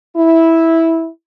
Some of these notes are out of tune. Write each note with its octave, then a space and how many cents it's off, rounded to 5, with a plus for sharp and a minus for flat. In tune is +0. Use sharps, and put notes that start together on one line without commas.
E4 -10